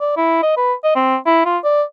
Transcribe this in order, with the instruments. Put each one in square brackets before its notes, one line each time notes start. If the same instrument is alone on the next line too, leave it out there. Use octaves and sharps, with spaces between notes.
[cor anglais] D5
E4
D#5
B4
D#5
C4
E4
F4
D5